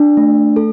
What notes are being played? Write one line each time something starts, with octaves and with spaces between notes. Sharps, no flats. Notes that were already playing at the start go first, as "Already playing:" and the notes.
Already playing: D4
A3
A4